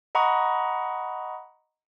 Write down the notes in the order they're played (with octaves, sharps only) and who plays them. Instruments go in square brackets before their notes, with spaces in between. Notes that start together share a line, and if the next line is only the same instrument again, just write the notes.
[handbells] D#5 F#5 A#5 B5 C#6 D#6